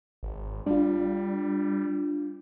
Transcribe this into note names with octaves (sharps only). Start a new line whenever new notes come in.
G#1
G3 D4 F4